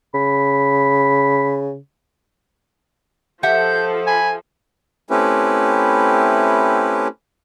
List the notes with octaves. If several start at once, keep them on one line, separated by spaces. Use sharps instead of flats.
C#3 B5
F3 G4 A4 E5 F#5 G6
G#5 B5
A3 C4 C#4 E4 G4 B4